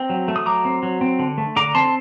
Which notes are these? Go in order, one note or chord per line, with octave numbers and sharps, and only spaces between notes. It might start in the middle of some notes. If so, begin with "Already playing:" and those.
Already playing: C4 G5 A#5
F#3
A3
D#6
F#3 A#5 D6
C4
F#3
C4
D3
A3
D3 A#5 D6
C4 A5 C6